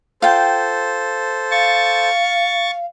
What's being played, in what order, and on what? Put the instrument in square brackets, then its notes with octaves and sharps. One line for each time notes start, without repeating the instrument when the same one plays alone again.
[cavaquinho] F4 G5 [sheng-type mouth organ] A4 C5
[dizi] F5 [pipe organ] C#6 A6